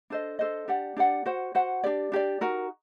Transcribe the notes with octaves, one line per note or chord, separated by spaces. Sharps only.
D4 A4 C5 D#5
D4 A4 C5 D#5
D4 G4 D5 F#5
D4 G4 D5 F#5
F#4 C5 F#5
F#4 C5 F#5
D4 G4 D5
D4 G4 D5
D#4 F#4 A#4